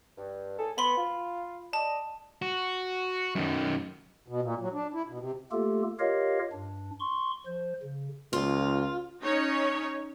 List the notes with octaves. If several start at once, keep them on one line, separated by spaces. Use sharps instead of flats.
G2
A2 G#4 A4
B3 B5 C6
F4
D5 D#5 A5
F#4
F#2 D#3
B2
A#2
F#3
D4
E4
B2
C3
A3 A#3 F4 G4 A4
F4 G4 A#4 C#5 D#5 F5
G2 D4
C6 C#6
F3 C5
C#3
C#2 F4
C#4 D#4 C#5